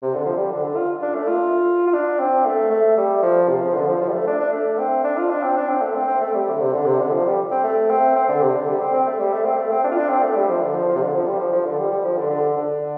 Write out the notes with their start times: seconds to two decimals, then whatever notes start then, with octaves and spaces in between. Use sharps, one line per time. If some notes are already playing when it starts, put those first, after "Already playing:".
0.02 C3
0.14 D3
0.25 F3
0.37 G3
0.51 D3
0.64 D3
0.76 F4
1.02 D4
1.15 A3
1.28 F4
1.87 F4
1.94 D4
2.20 C4
2.46 A3
2.70 A3
2.97 G3
3.23 F3
3.49 C3
3.61 F3
3.75 D3
3.87 F3
4.01 F3
4.08 G3
4.13 A3
4.27 D4
4.40 D4
4.53 A3
4.79 C4
5.04 D4
5.17 F4
5.30 D4
5.43 C4
5.57 D4
5.69 C4
5.82 A3
5.95 C4
6.08 C4
6.21 A3
6.34 G3
6.50 D3
6.59 C3
6.73 D3
6.86 C3
6.99 D3
7.11 F3
7.25 G3
7.51 C4
7.64 A3
7.90 C4
8.16 C4
8.29 D3
8.42 C3
8.55 D3
8.68 G3
8.80 C4
8.94 C4
9.07 A3
9.20 G3
9.33 A3
9.45 C4
9.58 A3
9.72 C4
9.84 D4
9.92 F4
9.97 D4
10.10 C4
10.23 A3
10.36 G3
10.49 F3
10.61 D3
10.74 F3
10.89 F3
10.96 C3
11.02 D3
11.14 F3
11.26 G3
11.40 F3
11.53 F3
11.66 D3
11.79 G3
11.92 G3
12.05 F3
12.18 D3
12.30 D3
12.57 D3